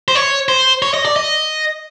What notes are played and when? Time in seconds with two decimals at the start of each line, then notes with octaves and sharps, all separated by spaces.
0.08 C5
0.15 C#5
0.48 C5
0.82 C#5
0.94 D#5
1.05 D5
1.16 D#5